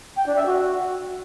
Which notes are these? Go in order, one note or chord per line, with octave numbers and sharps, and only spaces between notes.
G5
D4
E5
F#4